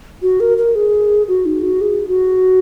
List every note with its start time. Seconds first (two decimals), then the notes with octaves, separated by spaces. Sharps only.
0.22 F#4
0.40 A#4
0.58 A#4
0.75 G#4
1.28 F#4
1.46 D#4
1.63 F#4
1.81 G#4
2.08 F#4